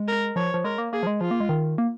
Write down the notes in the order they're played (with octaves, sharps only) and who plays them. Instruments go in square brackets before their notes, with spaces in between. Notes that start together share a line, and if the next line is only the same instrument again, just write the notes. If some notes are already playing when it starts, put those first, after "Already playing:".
Already playing: [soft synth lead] G#3
[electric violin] A#4
[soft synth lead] F3 [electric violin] C#5
[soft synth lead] F3
[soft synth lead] G#3 [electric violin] A#4
[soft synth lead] A#3
[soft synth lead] A#3 [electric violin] G#4
[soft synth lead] F3
G#3
[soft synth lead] F3 [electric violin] F4
[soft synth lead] A#3
G#3
D#3
A#3